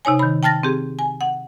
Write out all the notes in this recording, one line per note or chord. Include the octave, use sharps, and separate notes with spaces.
C3 D#4 C#5 G#5
D#3 B5
G5 A5 F6 A6 A#6
C4 G4 G#4
G#5
F#5